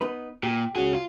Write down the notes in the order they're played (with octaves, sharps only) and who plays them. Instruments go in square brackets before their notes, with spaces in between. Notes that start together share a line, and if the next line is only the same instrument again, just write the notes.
[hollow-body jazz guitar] B3 D#4 B4
[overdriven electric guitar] A#2 [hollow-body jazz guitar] G4
[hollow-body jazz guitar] C#2 F#4 [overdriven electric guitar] C#4 G#4
[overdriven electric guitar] F4